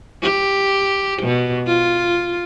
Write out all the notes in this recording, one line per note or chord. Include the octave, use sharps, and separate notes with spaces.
G4
B2
F4